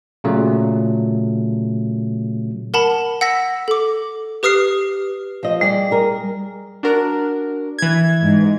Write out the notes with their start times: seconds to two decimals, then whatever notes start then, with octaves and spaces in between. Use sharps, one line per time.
0.24 A#2 C#3 F#3 A3
2.74 A#4 F#5 A5 B5
3.21 F#5 E6 A#6 B6
3.68 A4 D6
4.43 G4 B4 D#6 F6 C7
5.43 F3 D#5
5.61 G3 G#4 D5
5.91 G#4 A#4
6.83 D4 F#4 A#4
7.79 E3 G#6
8.21 G#2